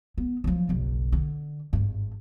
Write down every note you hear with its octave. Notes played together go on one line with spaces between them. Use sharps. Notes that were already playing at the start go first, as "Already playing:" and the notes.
B3
F3 F#3
F#1 B1
D3
G#1 G2